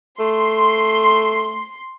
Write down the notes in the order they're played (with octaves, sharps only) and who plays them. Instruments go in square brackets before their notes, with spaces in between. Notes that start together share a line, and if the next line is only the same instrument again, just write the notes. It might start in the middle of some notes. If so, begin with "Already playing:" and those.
[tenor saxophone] A3 [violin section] C6